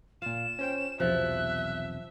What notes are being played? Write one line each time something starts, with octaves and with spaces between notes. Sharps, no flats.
A#2 F4 F5 E7
C#4 C5 G5
B1 E2 C3 F3 E5 F#6